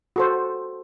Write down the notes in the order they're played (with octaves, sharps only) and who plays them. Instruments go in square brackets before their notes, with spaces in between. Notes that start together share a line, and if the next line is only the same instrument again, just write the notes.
[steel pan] F#4 A4 C5